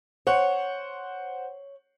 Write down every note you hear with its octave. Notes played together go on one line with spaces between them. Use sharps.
C5 C#5 F#5